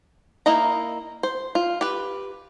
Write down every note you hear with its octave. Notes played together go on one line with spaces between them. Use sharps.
A#3 D#4 E4 D#5 A#5
C5
F4
G4 B4